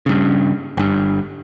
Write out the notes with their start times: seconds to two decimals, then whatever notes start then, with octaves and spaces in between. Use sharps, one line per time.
0.06 G2 C#3
0.77 G1 G2